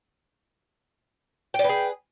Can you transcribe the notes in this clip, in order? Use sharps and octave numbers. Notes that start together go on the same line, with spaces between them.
G#4 B4 D5 G5